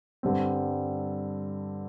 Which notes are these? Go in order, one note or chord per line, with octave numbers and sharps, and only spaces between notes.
G2 D3 G3 C4